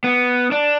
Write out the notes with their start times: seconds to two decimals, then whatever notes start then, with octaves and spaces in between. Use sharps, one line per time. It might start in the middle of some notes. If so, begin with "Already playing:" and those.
0.04 B3
0.52 D4